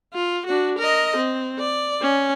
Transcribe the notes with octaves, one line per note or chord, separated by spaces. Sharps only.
F4
D4 F#4
A#4 D#5
C4
D5
C#4